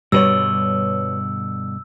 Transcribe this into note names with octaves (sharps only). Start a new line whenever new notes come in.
G2 B2 D3 G3 B4 C#5 E6